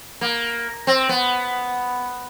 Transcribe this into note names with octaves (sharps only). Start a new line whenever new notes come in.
A#3
C4
B3